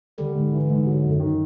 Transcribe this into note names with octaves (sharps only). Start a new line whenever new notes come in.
D3 G3
G#2
E3
G#2
F#3
F#2
D#3